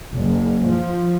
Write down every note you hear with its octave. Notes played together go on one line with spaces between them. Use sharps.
F#1
F3